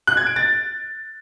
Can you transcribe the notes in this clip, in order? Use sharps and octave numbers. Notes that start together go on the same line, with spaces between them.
F#6
G#6
D7
A6